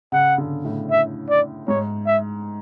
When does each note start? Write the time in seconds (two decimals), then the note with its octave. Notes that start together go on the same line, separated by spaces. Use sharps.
0.12 C#3 F#5
0.38 D3
0.65 A2
0.91 E5
1.29 D5
1.68 G#2 C#5
2.06 E5